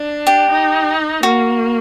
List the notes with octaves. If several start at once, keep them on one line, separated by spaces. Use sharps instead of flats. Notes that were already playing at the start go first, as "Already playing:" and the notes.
Already playing: D4
G4
D#4
A#3 F#4